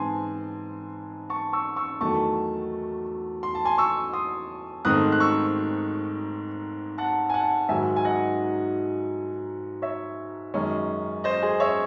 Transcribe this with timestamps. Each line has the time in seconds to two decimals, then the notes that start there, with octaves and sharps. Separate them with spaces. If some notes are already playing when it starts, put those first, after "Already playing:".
Already playing: G#2 E3 C4 G#5 A5 C6
1.30 A5 C#6
1.53 C#6 E6
1.76 C#6 E6
2.01 E2 D#3 F#3 A3 A5 C#6
3.43 C6
3.55 A5
3.65 G#5 C6
3.78 C#6 E6
4.13 C6 D#6
4.85 G#2 D#3 A3 C4 D#6 F#6
5.12 F#6
5.20 C#6 E6
6.98 F#5 A5
7.30 G#5
7.34 F#5 A5
7.69 G#2 D#3 F#3 E5 G#5
7.96 G#5
8.05 D#5 F#5
9.82 C#5 E5
10.54 F#2 D#3 G#3 C#4
11.24 C5 D#5
11.42 G#4 C5
11.60 C#5 E5